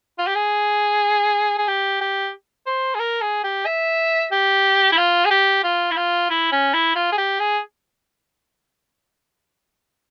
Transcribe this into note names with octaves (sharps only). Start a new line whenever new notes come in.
F4
G4
G#4
G#4
G4
G4
C5
G#4
A#4
G#4
G4
E5
G4
E4
F4
G#4
G4
F4
E4
F4
E4
C#4
E4
F4
G#4
G4
G#4